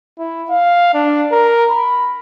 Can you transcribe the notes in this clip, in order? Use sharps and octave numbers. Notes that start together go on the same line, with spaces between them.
E4
F5
D4
A#4
B5